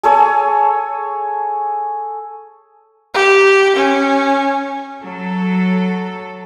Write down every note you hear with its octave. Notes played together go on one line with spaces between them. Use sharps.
G#4 A4 C#5 G#5
G4
C#4
F#3 A4